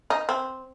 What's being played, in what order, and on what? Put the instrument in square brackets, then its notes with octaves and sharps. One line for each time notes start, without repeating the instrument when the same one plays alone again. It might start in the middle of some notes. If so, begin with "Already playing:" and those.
[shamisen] D#4
C4